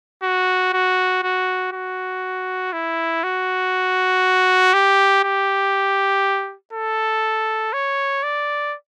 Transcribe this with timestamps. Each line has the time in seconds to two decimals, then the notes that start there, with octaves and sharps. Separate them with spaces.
0.23 F#4
0.73 F#4
1.23 F#4
1.73 F#4
2.73 E4
3.24 F#4
4.74 G4
5.24 G4
6.73 A4
7.73 C#5
8.23 D5